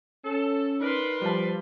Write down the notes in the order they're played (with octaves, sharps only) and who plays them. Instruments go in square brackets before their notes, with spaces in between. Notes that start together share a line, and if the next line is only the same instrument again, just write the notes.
[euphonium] C#4 [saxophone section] A4
[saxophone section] D4 A#4 [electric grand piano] D#4 [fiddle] B4 C6
[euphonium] F3 [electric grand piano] G3 A5